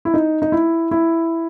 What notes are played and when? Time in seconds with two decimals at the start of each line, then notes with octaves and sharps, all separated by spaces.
0.05 E4
0.14 D#4
0.42 D#4
0.52 E4
0.91 E4